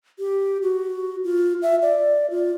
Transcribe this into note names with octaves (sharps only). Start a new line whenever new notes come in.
G4
F#4
F4
E5
D5
F4